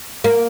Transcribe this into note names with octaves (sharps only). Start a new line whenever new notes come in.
A#3